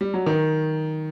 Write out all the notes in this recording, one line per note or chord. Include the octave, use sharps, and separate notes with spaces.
G3
F#3
D#3